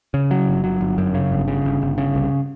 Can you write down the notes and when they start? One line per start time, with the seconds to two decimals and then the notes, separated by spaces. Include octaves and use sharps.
0.14 C#3
0.31 F#3
0.48 G1
0.64 F#3
0.81 G1
0.98 F#2
1.14 C#3
1.31 G1
1.48 C#3
1.65 G1
1.81 G1
1.98 C#3
2.15 C2